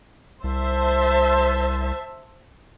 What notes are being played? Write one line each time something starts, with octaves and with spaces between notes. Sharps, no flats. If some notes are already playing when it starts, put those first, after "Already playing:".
C2 C5 E5 A5